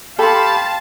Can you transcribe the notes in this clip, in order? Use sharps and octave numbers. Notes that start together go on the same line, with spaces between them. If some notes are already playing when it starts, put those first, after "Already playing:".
G4 A4 F5 G5 A5 B5 C6